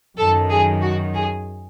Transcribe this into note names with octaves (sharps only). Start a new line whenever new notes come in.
F#2 D#3 A4
G#4
F#4
G#4